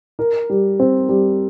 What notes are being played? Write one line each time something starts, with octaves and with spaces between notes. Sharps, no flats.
A#4
G3
C4
G3